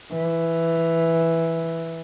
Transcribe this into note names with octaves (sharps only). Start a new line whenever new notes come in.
E3